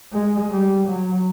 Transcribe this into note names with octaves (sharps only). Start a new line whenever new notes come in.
G#3
G3
F#3